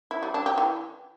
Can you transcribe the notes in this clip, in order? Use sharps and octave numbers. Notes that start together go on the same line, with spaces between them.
E4
G3
D4
G4
E3